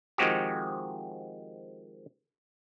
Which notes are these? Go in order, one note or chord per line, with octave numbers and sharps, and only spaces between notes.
D#3 F3 G#3 C4 F#4 G4